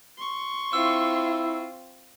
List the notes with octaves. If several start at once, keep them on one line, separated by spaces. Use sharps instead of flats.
C6 C#6
C4 E4 F4 E6